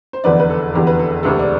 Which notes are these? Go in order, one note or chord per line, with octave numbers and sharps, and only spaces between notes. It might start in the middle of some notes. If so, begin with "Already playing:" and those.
C5
F1 E2 D3 B4 D5
B4
A4
F1 E2 D3 G4
B4
A4
E1 D2 C3 A4
D5